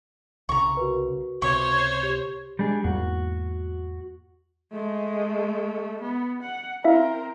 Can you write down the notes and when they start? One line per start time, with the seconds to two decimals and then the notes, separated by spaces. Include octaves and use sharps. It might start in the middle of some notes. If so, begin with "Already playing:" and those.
0.49 C2 C#3 A#5 C#6
0.77 F#4 A#4 B4
1.42 C#2 C3 C5 C#5 C#6
2.03 G4
2.59 G3 G#3 D4 G#4
2.84 E2 G#2 A#3 F#4
4.72 G#3 A3
6.02 B3
6.43 F#5
6.84 C4 E4 A#4 E5 F5